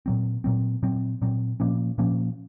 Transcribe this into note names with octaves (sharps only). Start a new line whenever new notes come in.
A#2 F#3 C4
A#2 F#3 C4
A#2 F#3 C4
A#2 F#3 C4
A#2 F3 A#3 C#4
A#2 F3 A#3 C#4